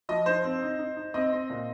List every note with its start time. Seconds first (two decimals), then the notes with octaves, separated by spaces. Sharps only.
0.09 F3 D#5
0.26 D#4 C5
0.44 C4
0.62 D#4
0.79 D#4
0.97 D#4
1.14 C4 D#5
1.33 C4
1.50 A#2